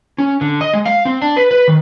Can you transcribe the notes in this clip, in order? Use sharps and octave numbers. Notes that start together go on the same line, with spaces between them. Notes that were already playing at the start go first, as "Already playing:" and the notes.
C#4
D3
D#5
G#3
F5
C4
D4
B4
B4
D#3